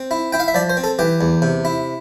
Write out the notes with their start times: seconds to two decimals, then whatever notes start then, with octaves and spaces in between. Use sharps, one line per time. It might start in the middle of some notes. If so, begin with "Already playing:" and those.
Already playing: C4
0.11 E4
0.32 E4 G5
0.40 F5
0.48 E5
0.55 F3 D5
0.70 C5
0.77 C4
0.84 A4
0.99 E3 G4
1.21 E2
1.42 C3
1.65 E4